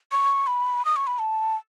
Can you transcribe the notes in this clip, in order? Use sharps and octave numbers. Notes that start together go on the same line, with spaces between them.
C#6
B5
D#6
C#6
B5
A5